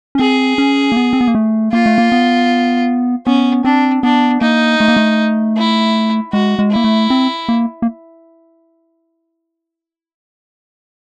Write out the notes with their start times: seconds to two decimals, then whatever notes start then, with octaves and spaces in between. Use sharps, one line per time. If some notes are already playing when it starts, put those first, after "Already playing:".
0.15 C#4
0.19 C4 G#4
0.58 C#4
0.92 A#3
0.97 B3
1.13 C4
1.21 B3
1.28 A#3
1.35 A3
1.73 A#3 F4
1.86 A3
1.98 A#3
2.12 B3
3.26 B3 C#4
3.65 C4 D4
4.03 B3 D4
4.41 A#3 D#4
4.80 A3
4.88 A#3
4.97 A3
5.57 E4
6.33 G#3 F#4
6.59 G#3
6.72 A#3 E4
6.84 A3
7.10 C4
7.49 A#3
7.82 A#3